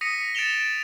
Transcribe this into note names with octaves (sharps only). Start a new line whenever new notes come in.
D#6 A#6 B6 C#7 D#7
A6 D7 E7 F7 G7